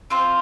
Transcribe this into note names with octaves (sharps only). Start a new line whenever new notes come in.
C4 F4 C5